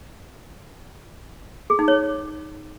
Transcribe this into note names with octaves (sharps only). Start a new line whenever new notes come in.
G#4
D#4
C#5